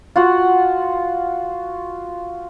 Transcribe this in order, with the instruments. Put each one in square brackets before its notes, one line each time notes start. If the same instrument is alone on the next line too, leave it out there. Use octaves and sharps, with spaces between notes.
[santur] F4 F#4 F#5